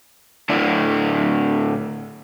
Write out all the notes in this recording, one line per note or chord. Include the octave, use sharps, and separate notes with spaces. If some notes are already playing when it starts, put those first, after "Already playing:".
A2 D3 E4 D5